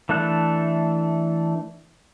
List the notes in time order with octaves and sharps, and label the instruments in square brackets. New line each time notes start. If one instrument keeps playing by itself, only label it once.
[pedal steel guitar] E3 A3 D4 A4 F#6